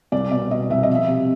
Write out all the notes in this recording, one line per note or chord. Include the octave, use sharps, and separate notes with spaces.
C2 D5
B2 D5
B2 D#5
C2 E5
D#5
F3
E5
C3